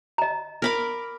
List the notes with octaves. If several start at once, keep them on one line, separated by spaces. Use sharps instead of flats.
D#5 A#5
A#4 B5 D6